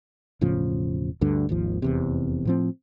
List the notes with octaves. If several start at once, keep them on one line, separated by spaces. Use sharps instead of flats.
E1 A2 C#3 F3
D2 G2 D3
G#1 D#2 F3
F1 E2 C3
A2 F3 C4